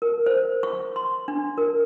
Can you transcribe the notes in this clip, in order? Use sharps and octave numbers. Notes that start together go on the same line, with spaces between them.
A#4
C5
C#6
C6
D4
A#4